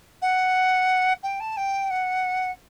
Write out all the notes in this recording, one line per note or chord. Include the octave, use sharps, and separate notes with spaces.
F#5
G5
A5
G5
F#5